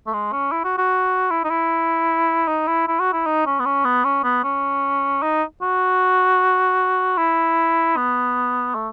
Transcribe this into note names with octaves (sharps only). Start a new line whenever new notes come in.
A3
G#3
C#4
E4
F#4
F#4
E4
D#4
E4
D#4
E4
E4
F#4
E4
D#4
C#4
B3
C#4
B3
C#4
B3
C#4
D#4
F#4
E4
B3
A3